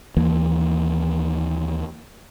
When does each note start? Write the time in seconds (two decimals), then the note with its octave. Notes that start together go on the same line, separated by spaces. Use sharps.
0.17 D#2 E3 A#3